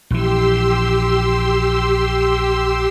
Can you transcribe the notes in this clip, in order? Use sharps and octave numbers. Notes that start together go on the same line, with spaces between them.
A#1 E3 G4 C6 E6